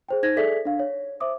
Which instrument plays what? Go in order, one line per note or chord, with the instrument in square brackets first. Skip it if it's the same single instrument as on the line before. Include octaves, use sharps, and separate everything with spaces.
[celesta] G#4 C5 G5
D#4 C5 G#6 A#6
G#4 A4 D5 E5 G#5 B6
D4 F5
C#5
C5 E5 D6 D#6